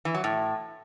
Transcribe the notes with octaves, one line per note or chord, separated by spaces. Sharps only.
E3
F#3
A2